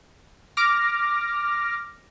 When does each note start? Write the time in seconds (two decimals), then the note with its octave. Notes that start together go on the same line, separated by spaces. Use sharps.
0.57 D6 F6 A#6